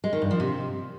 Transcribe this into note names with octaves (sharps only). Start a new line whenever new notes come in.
G#3
D#3
G2
F3
C3